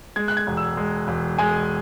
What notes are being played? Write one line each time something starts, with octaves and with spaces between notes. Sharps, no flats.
G#3 G#6
F#6
G#6
E1
E6
G#3
E1
G#3 G#5